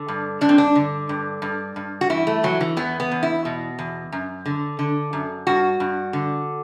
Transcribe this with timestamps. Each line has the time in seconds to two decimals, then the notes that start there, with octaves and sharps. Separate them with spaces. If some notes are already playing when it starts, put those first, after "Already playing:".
Already playing: D3
0.08 G2
0.41 G2 D4
0.49 C4
0.58 D4
0.75 D3
1.09 G2
1.42 G2
1.76 G2
2.01 F#4
2.10 E3 E4
2.27 A3
2.43 E3 F#3
2.60 E3
2.77 E2 B3
3.00 B3
3.11 E2
3.23 E4
3.45 B2
3.79 E2
4.12 F#2
4.46 D3
4.79 D3
5.13 F#2
5.47 G2 F#4
5.80 G2
6.13 D3